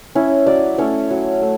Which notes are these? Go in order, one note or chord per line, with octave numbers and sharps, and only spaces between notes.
C#4 E4
F#3 D5
A3 C#4 E4 C#5
F#3
A3